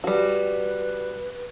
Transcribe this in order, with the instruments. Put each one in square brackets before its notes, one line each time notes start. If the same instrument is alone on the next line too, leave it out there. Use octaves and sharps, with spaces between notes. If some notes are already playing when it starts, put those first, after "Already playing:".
[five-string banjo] G3 F#4 [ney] B4